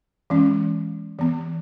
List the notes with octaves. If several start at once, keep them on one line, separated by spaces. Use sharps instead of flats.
E3 G#3 C#4
E3 B3